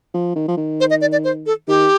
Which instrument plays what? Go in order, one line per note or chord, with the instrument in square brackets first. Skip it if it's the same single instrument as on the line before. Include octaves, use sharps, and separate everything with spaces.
[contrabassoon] F3
D#3
F3
D#3
[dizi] C5
D#5
D5
D5
C5
A4
[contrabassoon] D#3 [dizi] G4